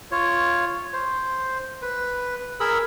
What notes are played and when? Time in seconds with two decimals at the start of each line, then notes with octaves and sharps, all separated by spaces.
0.11 F4 C#5
0.93 C5
1.82 B4
2.60 G#4 A#4 B5 E6